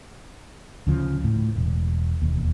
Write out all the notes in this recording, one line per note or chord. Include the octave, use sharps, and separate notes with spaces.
D2 C#3 F3
A2
E1
E1 D#2